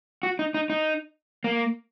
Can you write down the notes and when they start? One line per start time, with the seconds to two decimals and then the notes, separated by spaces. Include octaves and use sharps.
0.23 F#4
0.39 D#4
0.54 D#4
0.70 D#4
1.44 A#3